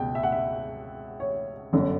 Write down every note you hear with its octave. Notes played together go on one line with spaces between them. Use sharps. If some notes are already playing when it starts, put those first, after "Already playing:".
Already playing: C#2 B2 G5
E5
F#5
E5
C#5
G1 F#2 D3